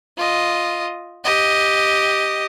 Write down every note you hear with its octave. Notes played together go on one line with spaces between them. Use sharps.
F4 D#5
G4 D#5